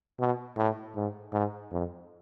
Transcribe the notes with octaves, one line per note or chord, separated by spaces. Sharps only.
B2
A2
G#2
G#2
F2